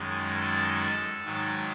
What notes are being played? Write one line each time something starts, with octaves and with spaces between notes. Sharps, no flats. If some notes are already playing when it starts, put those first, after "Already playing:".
Already playing: F#2 D#3 G#3
A4
G#2 D#3 F#3